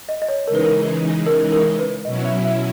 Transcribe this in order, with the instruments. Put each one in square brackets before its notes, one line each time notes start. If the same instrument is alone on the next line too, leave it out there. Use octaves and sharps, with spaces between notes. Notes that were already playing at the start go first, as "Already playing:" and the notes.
[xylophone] D#5
D#5
C#5
[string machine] C#3 E3 G#3 D#4 [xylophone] A#4
[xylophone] B4
A#4
A#4
A#4
B4
[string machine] B2 F#3 C#4 E4 [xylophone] D#5
[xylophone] E5
E5